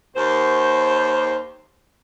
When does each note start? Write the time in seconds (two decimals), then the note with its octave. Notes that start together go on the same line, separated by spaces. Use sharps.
0.15 D#2 C5